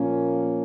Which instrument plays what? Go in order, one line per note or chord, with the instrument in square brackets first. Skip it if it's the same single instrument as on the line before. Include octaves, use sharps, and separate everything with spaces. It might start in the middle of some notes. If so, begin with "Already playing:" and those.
Already playing: [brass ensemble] A#2 F3 A#3 C#4